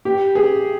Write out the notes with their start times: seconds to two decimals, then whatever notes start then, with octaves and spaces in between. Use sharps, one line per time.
0.05 G4
0.35 G#4